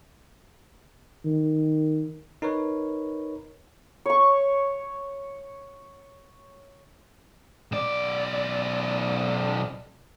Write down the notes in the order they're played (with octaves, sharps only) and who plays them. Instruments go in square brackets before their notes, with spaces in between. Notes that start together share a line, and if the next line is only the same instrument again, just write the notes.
[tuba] D#3
[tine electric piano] D#4 A#4 B4 C#5
[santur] C#5 C#6
[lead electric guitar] B1 D5